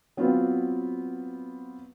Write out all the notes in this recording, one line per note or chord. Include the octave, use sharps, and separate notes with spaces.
F#3 B3 C4 F4